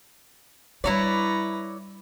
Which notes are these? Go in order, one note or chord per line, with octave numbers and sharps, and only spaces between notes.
G3 D4 E4 B4 C#5 D5 A#5